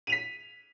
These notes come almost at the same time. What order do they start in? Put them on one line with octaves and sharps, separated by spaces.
D#7 F7 B6